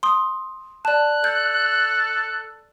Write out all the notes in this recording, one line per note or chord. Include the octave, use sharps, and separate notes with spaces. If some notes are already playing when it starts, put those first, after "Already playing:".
C6 D#6
D5 A5 F#6
A4 G6